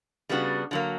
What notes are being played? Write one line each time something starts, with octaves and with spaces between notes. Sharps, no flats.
C#3 G3 B3 D4 F#4
D3 F#3 A#3